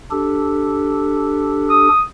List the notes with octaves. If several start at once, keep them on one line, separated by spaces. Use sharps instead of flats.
D4 G4 A4
D#6